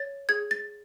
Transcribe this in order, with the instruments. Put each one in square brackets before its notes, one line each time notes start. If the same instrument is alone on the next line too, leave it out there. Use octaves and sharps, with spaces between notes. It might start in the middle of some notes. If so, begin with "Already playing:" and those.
Already playing: [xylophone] C#5 A6
G#4 G#6
A6